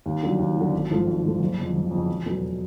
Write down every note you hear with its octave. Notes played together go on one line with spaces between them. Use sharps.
D#2
D3 F#3
D#2
D3 F#3
G#1
G#2 F3 A3
G#1
G#2 F3 A3
F#1
F2 C#3
F#1
F2 C#3
E1
E2 B2 F#3 A3